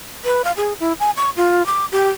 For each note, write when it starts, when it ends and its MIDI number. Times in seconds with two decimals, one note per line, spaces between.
0.25 0.42 71
0.44 0.52 77
0.57 0.73 68
0.80 0.93 64
1.00 1.11 80
1.17 1.30 85
1.37 1.66 65
1.66 1.86 86
1.92 2.09 67